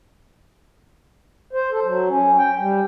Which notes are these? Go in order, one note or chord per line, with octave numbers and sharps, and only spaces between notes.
C5
A4
F#3
C#4
G5
G3